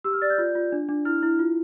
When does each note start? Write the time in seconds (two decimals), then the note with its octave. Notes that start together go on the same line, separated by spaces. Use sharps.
0.04 G4 E6
0.13 F6
0.22 D5 A6
0.30 G6
0.38 F4
0.55 F4
0.72 D4
0.89 D4
1.05 E4 F6
1.22 E4
1.39 F4